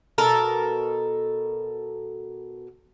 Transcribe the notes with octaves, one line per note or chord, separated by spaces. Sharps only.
B2 A4 A#4